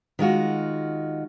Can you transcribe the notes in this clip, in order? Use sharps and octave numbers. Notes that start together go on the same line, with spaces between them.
D#3 G#3 F4 F#4